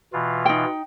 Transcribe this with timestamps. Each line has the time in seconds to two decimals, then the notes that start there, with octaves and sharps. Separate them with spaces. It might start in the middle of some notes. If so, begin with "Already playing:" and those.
0.13 B2 E3 F4
0.46 D#4 G5